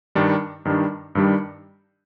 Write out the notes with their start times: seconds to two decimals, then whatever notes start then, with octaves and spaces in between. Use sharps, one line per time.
0.15 G2 D#3 G3 D4
0.65 G2 D#3 G3 D4
1.15 G2 D#3 G3 D4 G4